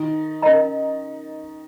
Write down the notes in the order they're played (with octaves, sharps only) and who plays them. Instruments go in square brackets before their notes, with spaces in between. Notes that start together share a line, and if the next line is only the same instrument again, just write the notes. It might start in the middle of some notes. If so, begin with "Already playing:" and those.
Already playing: [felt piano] D#3 D#4
[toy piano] C#4 A#4 D#5 A#5